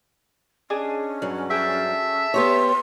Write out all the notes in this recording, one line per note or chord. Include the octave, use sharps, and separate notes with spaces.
C#4 D4 G#4 D#5
G2 F#3
G#4 A4 E5 G5
B3 G4 C#5 C6